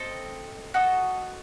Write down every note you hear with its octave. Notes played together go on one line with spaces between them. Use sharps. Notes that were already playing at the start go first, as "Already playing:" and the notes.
Already playing: C4 A4 D#5
F#4 A4 D#5